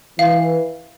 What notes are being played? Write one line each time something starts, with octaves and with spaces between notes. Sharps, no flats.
E3 F5